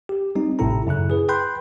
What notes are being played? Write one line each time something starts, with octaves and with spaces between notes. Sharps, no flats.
G4
G3 C4 D#4
A1 A2 C3 E4 A4 A#5
F#2 C#3 E4 F#6
G#4 B4
B4 G5 B5 C6 F#6 G6